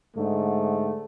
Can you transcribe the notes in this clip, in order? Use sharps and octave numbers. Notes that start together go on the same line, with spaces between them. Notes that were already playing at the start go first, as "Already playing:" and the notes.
G#2 D3 A3